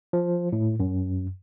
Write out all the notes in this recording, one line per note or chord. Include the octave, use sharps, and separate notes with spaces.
F3
A2
F#2